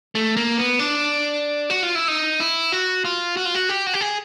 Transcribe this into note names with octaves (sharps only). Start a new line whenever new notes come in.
A3
A#3
B3
D4
F#4
F4
E4
D#4
E4
F#4
F4
F#4
F4
F#4
G4
F#4
G4
G#4